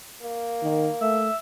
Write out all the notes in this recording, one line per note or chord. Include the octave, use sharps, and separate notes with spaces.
A#3
D#3
A3 E5